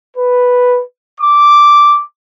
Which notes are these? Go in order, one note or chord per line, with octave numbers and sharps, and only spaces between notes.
B4
D6